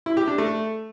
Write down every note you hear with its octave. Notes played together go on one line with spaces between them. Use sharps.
E4
G4
D4
A3